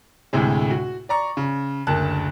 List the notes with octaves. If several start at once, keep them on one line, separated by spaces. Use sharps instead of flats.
D2 A2 C3 G#3
F#4
D5 A#5 C#6
C#3
F#1 D2 A#4 A5 F#6